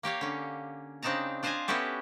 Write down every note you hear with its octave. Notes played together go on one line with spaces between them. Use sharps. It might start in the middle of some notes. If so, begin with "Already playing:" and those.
A#3 G4 C#5 F5
D3 C#4
C#3 C4 D4 D#4 A5 A#5
D4 F4 C5 D#5 F5 G#5
B3 C#4 E4 F#4 G4 A4